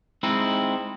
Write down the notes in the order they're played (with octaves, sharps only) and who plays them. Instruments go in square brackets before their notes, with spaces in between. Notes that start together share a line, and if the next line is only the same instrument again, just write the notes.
[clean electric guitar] G#3 C4 D#4 E4